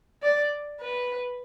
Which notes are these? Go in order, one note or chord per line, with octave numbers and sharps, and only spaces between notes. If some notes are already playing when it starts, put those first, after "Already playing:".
D5
B4